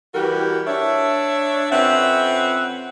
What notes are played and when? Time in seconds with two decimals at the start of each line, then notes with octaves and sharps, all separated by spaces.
0.15 E3 G3 F#4 G4 A#4 B4
0.67 D4 C#5 E5
1.72 F2 C4 C#4 B4 E5 F#5